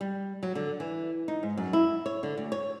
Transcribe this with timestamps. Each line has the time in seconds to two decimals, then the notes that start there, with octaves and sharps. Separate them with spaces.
0.01 G3
0.43 F#3
0.55 D3
0.80 E3
1.28 D#4
1.43 G#2
1.57 F#2
1.73 E4
2.06 C#5
2.23 D3
2.38 D2
2.52 C#5